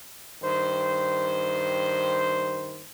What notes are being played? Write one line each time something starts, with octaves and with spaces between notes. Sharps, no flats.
G2 D#3 C5